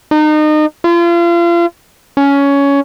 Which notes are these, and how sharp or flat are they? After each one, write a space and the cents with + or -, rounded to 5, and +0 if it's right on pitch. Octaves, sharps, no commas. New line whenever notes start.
D#4 -30
F4 -35
C#4 +15